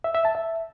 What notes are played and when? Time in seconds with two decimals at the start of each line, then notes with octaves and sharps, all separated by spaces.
0.04 E5
0.15 E5
0.25 A5
0.35 E5